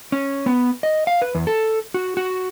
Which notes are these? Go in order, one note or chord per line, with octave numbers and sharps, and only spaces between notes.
C#4
B3
D#5
F5
B4
E2
A4
F#4
F#4